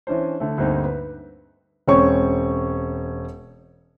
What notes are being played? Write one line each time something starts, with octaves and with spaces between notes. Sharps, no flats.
E3 C#4 D4 C5
D3 A3
D2 G2 A3 A#3 C4 D#4
B4
E1 C4 C#4 C#5 C#6